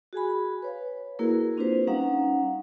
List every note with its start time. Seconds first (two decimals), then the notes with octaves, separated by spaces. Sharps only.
0.13 F#4 G#4 G#5 B5
0.62 B4 C#5 F5
1.19 A#3 E4 F#4 G#4 A#4
1.57 C4 D4 F4 G4 B4 C5
1.87 G3 C#4 D#4 F5 F#5 A#5